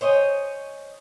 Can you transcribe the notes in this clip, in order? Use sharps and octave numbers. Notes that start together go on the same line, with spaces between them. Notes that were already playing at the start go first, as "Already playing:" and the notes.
C5 C#5 D#5 G#5